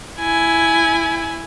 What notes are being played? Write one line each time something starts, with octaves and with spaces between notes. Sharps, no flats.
E4 G#5